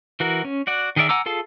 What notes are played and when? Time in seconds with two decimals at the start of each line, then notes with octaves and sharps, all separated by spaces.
0.20 E3 F#4 A#4
0.45 C#4
0.67 F#4 D5 F#5
0.96 D#3 G#4 A#4 D5 E5
1.09 F#5 G#5 A#5 D6 E6
1.26 F4 G#4 A4 F5 A5